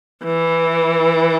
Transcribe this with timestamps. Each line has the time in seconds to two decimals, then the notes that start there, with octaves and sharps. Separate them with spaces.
0.24 E3